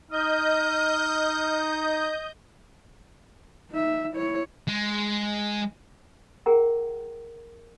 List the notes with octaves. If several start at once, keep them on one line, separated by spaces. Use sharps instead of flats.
D#4 D#5 F6 G6
D#4 E5
E4 C#5
G#3
G#4 A#4 F#5 G5 A#5